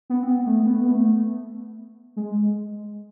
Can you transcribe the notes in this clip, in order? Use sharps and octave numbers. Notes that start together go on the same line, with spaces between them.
B3
C4
B3
A3
B3
B3
A3
G#3